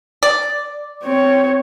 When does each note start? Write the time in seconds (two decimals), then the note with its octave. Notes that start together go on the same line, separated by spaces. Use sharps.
0.23 D5
1.03 C4 C#5